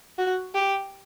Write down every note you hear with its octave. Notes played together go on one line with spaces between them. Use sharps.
F#4
G4